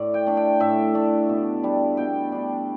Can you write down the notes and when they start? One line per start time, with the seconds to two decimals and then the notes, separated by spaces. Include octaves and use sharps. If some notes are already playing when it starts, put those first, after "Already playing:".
Already playing: A2 D5
0.14 G5
0.26 A3 D4
0.37 G5
0.60 A2 E5
0.94 A3 D4
1.29 B2
1.63 G3 D4
1.97 B2 G5
2.32 G3 D4